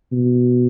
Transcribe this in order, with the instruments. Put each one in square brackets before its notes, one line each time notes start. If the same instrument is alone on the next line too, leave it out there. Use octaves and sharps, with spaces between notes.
[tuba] B2